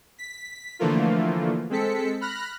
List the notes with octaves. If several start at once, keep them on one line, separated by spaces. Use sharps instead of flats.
B6
D3 E3 F3 A3 A#3 F4
G#3 C4 A4 B6 C#7
B5 F6 F#6 A#6